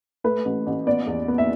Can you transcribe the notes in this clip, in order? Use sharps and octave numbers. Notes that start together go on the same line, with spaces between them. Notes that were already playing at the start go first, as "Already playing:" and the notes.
A3 B4
A1
A1
B3 D5
E2
B3
E5